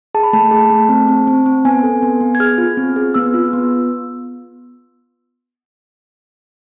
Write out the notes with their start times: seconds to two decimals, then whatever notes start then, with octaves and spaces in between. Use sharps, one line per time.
0.15 G#4 A5
0.23 B5
0.33 A3 A5
0.51 G#4
0.70 A3
0.89 C4
1.08 C4
1.27 C4
1.46 C4
1.65 B3 G#5
1.83 A4
2.03 B3
2.21 B3
2.35 G#6
2.40 G#4 F6
2.58 F4
2.77 C4
2.96 G#4
3.14 B3 E6
3.34 F4
3.53 B3